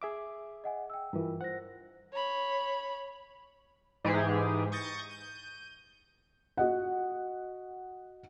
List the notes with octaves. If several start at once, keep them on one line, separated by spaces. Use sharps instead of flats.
G#4 E5 D6
D#5 F#5 G#5
G5 E6
G2 E3 E4 F4 A#4
C5 F#5 A#6
C#5 B5
G#2 E3 G4 G#4
C#6 D#6 G6 A6 A#6 C#7
G6 D#7
F#4 D#5 F#5